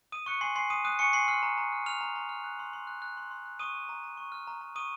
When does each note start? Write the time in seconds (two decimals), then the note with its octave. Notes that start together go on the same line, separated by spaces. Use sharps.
0.12 D#6 D#7
0.26 C#6 F#6 C#7
0.41 G#5 C6 C7
0.56 G#5 C6 C7
0.70 D#6 D#7
0.85 D#6 F#6 D#7
0.99 G#5 C#6 C#7
1.13 G#5 C6 C7
1.28 C6 F6 C7
1.43 A#5
1.58 A#5
1.72 F6
1.86 F6 F7
2.01 A#5
2.16 A#5
2.29 F6
2.44 F#6
2.59 C6
2.73 C6
2.87 F#6
3.02 F#6
3.17 C6
3.31 C6
3.45 F#6
3.59 C#6 D#6 D#7
3.74 F6
3.89 A#5
4.04 A#5
4.17 C#6
4.32 F6
4.47 A#5
4.61 A#5
4.76 C#6 D#6 D#7